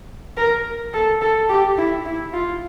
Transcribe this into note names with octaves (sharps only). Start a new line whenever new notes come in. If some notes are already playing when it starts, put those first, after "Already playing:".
A#4
A4
A4
G4
E4
E4
F4